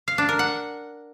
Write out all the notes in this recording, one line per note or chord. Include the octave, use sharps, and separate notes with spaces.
F5
D4
A#4
F#5